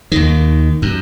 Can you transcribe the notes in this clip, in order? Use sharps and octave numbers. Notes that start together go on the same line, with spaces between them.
D#2 D#3
F#2